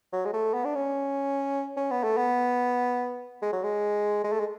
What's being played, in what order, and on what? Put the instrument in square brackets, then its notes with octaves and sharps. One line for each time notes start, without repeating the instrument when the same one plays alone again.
[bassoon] F#3
G#3
A3
B3
D4
C#4
C#4
B3
A3
B3
G#3
F#3
G#3
G#3
A3
G#3